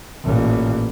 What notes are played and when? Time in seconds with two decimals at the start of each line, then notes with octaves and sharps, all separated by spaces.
0.24 A1 A#2